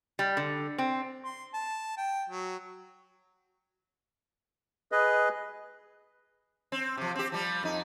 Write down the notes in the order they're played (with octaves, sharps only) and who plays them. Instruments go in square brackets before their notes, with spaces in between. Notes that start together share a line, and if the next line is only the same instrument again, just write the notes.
[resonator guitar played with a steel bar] G3
D3
C4
[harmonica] C6
A5
G5
F#3
[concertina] G#4 B4 D#5
[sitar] C4
C3 F3
C4 G4
F3 G3
F2 D#4